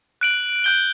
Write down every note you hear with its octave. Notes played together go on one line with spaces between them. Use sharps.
F#6 D7 F#7
F#6 G6 G7